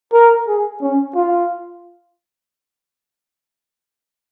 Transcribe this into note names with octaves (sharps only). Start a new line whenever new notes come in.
A#4
G#4
C#4
F4